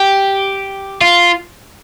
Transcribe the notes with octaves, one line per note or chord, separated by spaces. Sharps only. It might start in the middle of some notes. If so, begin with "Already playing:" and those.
Already playing: G4
F4